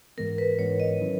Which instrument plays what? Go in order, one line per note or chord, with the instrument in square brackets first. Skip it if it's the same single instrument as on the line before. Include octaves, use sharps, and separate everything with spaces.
[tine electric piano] G#2 E3 G#3 B3 [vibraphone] A#4
[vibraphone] B4
[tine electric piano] G#2 E3 G#3 B3 [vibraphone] C#5
[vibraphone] D#5
[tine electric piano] D#3 F#3 C#4 E4